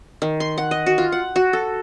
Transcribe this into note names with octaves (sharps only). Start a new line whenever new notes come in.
D#3
C6
F#5
D#5
F#4
F4
F#5
F#4
A4